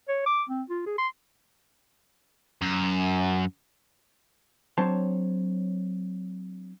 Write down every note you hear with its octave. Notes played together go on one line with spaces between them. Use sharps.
C#5
D6
C4
F4
G#4
C6
F#2
F#3 C4 D4 C5 C#5 A5